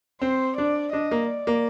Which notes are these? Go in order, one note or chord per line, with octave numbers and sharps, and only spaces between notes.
C4 C5
D4 D5
D4 D#5
A#3
D5
A#3